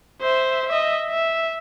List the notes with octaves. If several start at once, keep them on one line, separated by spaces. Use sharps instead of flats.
C5 E5
D#5 E5
E5